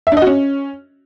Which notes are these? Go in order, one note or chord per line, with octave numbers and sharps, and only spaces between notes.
E5
D4
D#5
F#4
C#4